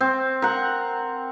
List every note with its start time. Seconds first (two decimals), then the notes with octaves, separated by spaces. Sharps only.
0.01 C4
0.42 A#4 F#5